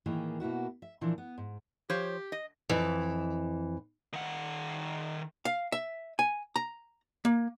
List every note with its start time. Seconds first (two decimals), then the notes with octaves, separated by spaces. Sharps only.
0.06 A2 D#3 E3 A#3 G#4
0.40 B2 A#3 E4 F#4
0.82 E5
1.01 A#2 E3 F3 D4
1.18 B3
1.38 G#2
1.90 F3 G4 C5 C#5
2.32 D#5
2.69 F2 E3
4.13 D#3 F#5
5.45 F5
5.72 E5
6.19 G#5
6.56 A#5
7.25 A#3